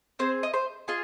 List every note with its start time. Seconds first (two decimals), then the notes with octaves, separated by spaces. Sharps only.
0.19 C4 G#4 C5
0.43 D#5
0.54 C5
0.88 F4 G#4 D#5